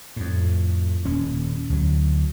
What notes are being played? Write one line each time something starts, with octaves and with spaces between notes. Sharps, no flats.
F2 A2
D#1 C#4
D2 F#3